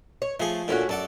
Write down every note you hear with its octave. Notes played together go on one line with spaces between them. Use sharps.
C#5
F3 A3 G#4
A#2 D3 A3 C#4 F#4
F#2 A4 D5 F#5